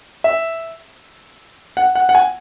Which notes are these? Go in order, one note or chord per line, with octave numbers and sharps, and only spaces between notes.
E5
F#5
F#5
F#5
G#5